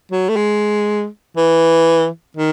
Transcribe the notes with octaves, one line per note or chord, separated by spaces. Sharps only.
F#3
A3
G#3
E3
D#3